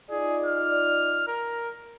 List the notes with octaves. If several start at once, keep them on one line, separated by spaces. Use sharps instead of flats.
D#4 F4 G#4 D5
F6
A#4